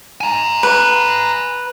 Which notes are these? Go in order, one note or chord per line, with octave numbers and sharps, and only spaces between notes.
G#5 A#5
B4